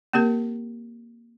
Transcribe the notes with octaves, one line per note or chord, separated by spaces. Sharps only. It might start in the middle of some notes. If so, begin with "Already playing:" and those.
A#3 C4 G4 A#4